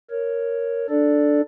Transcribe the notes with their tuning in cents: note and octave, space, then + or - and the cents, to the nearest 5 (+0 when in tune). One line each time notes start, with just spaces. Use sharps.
A#4 +0 C#5 +0
D4 +0 A4 +0 D5 +0